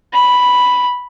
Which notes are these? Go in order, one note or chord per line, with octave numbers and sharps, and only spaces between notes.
B5